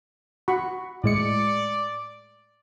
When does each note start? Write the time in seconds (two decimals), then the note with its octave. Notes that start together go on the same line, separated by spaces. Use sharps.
0.48 F#4 B5 C#6
1.04 A2 G#3 D5 C#7